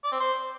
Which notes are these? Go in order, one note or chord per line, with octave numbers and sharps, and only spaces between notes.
D5
C4
C5